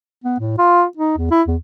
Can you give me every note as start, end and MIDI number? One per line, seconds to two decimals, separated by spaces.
0.24 0.36 59
0.40 0.57 45
0.58 0.85 65
0.97 1.14 63
1.17 1.30 40
1.31 1.42 64
1.47 1.56 40